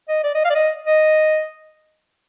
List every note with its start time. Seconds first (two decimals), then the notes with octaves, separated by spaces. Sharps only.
0.09 D#5
0.24 D5
0.35 D#5
0.45 F5
0.50 D5
0.55 D#5
0.87 D#5